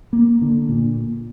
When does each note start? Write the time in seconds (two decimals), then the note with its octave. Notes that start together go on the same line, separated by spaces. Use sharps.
0.13 A#3
0.42 D3
0.69 A#2